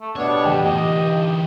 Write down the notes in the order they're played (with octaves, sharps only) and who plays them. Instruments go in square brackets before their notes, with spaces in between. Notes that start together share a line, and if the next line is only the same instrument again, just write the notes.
[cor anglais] A3
[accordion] B2 G3 B3 [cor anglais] D4 [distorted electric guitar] C#5
[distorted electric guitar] E2 A3 [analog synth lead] G4
[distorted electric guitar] E3 D#4 [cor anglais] D#5
[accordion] G2